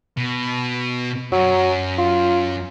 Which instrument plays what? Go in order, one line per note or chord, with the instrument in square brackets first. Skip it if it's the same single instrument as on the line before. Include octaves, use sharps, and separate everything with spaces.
[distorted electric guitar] B2
[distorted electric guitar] F#2 [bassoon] F#3
[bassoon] F4